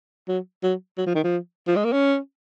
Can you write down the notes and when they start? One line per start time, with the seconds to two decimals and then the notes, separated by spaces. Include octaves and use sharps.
0.28 F#3
0.63 F#3
0.98 F#3
1.06 F3
1.15 D#3
1.24 F3
1.67 F3
1.76 G#3
1.85 A#3
1.93 C#4